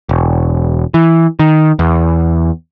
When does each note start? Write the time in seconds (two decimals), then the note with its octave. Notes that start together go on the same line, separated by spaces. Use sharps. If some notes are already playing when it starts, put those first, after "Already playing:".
0.09 E1
0.94 E3
1.39 D#3
1.79 E2